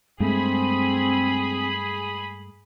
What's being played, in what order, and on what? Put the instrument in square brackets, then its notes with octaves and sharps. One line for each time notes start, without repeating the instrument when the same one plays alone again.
[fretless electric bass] G2 G#3 A3 [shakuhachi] C4 [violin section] G#4 B5 D#6